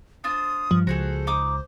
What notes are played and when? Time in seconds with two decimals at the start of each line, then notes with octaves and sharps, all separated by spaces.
0.24 D4 F4 C5 D#6
0.71 G2 F3
0.87 C#2 F#4 G#4 A4 C5
1.27 D#4 D6 D#6